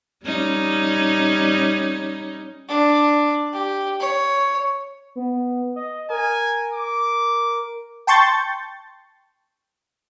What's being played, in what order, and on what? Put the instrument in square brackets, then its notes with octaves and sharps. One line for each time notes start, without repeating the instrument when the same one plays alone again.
[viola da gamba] G3 C#4 D#4
[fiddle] D4
G4
C#5
[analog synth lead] B3
D#5
[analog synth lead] A#4 [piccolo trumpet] G#5
[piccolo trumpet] D6
[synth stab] G5 A5 C6 C#6 G6 A6